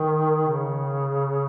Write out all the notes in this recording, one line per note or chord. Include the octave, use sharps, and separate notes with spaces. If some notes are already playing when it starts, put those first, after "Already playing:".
Already playing: D#3
C#3